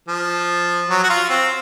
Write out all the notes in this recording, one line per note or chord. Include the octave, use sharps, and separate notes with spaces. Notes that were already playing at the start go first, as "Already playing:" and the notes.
F3
F#3
F#4
F4
C4